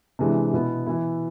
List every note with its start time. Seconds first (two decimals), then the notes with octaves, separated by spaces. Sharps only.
0.19 C3 E3 G#3 D4
0.53 B2 B3 E4
0.86 E3 B3 E4